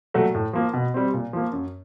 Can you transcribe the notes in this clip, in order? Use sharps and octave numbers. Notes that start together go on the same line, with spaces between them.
A#2 F#3 A3
A2
F3 A#3
B2
G3 C4
A#2
F3 A#3
F#2